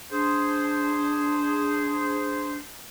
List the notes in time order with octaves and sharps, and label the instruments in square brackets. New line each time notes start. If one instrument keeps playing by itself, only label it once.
[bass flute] D4 [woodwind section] G#4 C5